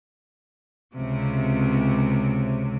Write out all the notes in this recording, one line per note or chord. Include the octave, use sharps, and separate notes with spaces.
C#2 C3